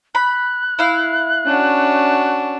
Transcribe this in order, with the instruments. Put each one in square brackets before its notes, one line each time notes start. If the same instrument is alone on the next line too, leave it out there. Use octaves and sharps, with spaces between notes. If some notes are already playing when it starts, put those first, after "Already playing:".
[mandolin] B5 [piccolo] F#6
[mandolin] E4 F5
[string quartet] C#4 D4 F#4